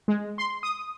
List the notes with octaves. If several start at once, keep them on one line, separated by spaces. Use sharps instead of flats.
G#3
C6
D#6